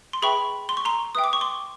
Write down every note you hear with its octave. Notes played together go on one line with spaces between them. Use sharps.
C6
G#4 B4 E5 G5 B5 C#6
C6
C#6
A#5 C6
B4 E5 G5 D#6
D6
C#6
C6 D6